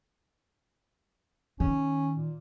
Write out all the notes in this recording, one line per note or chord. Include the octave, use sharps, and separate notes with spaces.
D#3 C#4
A#2